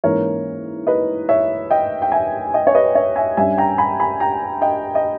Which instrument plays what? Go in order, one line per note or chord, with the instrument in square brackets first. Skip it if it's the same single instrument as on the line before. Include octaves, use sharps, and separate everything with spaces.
[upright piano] G#2 E3 A#3 C#4 A#4 C#5
B4 D#5
C#5 E5
D#5 G5
G5
E5 G#5
D#5 G5
C#5
B4 D#5
C#5 E5
E5 G#5
G2 G3 C#4 E5 G#5
G5 A#5
G#5 B5
G#5 B5
G5 A#5
D#5 G5
D#5